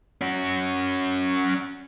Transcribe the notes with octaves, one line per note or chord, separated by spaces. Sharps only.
C#4 F#4